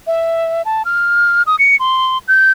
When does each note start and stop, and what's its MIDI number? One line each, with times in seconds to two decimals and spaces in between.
0.07 0.62 76
0.65 0.83 81
0.85 1.43 89
1.47 1.56 87
1.59 1.76 97
1.80 2.18 84
2.28 2.52 91